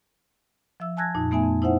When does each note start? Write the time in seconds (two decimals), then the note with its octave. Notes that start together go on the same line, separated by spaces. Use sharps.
0.80 F3 E5 E6
0.97 G#5 A5 E6 F#6 G#6 A#6
1.15 F2 A#2 D#4
1.31 A3 B3 D#4 E5 G#5
1.44 F2
1.62 D#4 E4 C5 E5 F#5